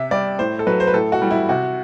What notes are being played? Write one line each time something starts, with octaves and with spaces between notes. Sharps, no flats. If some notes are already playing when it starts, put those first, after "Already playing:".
Already playing: C3 E5
G3 D5
A2 C5
A4
F#3 B4
C5
B4
A2 A4
F#4
E3 G3
E4
C3 F#4